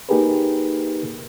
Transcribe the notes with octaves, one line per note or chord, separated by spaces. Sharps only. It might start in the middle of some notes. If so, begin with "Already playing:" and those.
A#3 D#4 G4 G#4 A#4 B4